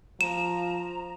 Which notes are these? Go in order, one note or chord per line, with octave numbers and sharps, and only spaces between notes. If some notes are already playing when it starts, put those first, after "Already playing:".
F3 A#5 E7